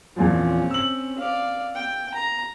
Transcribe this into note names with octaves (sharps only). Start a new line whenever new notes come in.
E2 A#2 F3 C4 C#4
E6 F#7
D5 F5
G5
A#5